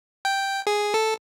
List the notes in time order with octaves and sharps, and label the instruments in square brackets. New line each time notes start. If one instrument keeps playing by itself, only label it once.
[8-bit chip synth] G5
G#4
A4